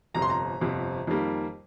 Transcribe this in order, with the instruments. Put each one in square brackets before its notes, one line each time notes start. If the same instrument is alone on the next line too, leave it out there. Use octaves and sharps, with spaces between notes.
[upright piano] G1 F2 C3 A#5
C6
A#5
G1 F2 C3
F2 D#3 G3 A#3